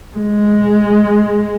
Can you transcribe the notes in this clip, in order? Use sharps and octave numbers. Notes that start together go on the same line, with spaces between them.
G#3